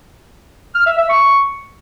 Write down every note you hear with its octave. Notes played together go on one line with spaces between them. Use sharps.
F6
E5
E5
C#6